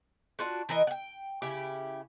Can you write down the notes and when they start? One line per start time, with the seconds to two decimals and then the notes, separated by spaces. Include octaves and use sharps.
0.39 D4 F4 F#4
0.69 E3 A#4 D#5
0.87 F#5 G5
1.42 C#3 E4 G4